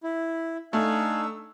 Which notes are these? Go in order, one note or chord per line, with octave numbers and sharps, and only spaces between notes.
E4
A3 D4 D#4 F5 G#5 E6